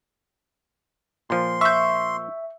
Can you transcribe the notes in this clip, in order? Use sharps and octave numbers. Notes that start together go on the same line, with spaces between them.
A#2 F3 C6
E5 C#6 G6